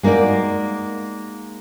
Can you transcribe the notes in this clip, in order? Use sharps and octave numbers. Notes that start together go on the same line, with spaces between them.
G#3 A#3 D#4 F#4 D5